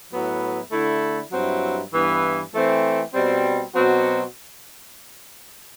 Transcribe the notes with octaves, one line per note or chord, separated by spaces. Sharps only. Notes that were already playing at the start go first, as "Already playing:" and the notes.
A2 F#3 B3 E4
D3 A3 E4
G2 F#3 C4 E4
G2 E3 B3 E4
E3 A3 C4
B2 G3 C4
B2 F#3 C4 F#4